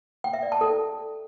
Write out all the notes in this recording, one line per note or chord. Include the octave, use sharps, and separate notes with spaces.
G5
E5
D5
A5
A4